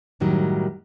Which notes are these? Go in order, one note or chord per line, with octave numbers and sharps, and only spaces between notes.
F#2 A2 D#3 F#3 G3